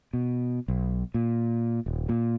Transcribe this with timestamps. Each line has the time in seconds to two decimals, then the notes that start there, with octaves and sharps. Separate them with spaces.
0.13 B2
0.68 B1
1.14 A#2
1.86 D#1
2.09 A#2